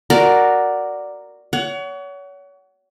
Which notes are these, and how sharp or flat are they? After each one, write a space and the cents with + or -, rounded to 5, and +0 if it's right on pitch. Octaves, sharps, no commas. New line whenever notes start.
F#4 +0 A#4 +0 D5 +0
C#5 +35 F#5 +20